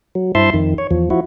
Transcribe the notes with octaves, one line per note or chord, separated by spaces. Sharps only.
F#3
G2 E4 C5 E5 A5 C6
F2 D#3
C#5
E2 F3
F3 E4 F#4